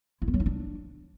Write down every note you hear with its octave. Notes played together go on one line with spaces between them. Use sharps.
E4
B3
F#3
D#4
D4